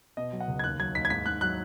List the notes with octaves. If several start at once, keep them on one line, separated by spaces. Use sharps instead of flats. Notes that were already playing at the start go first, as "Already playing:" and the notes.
B2 D#5
F#3
F#5
C#2
G#6
D#2 F#6
F#3 G#6
D#2 B6
G#6
G#2 B6
G#2 F#6
F#3 F#6